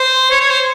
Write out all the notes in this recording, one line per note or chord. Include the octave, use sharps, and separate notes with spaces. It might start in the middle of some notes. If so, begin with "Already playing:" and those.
Already playing: C5
C#5
C#5
C5